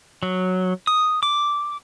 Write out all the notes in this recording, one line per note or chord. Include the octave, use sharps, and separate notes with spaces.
F#3
D#6
D6